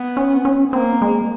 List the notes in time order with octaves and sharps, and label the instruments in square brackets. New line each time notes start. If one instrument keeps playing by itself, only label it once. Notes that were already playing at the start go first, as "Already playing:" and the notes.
Already playing: [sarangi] B3
[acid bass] C#4
C4
C#4
[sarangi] A#3 [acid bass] C4
[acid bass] G#3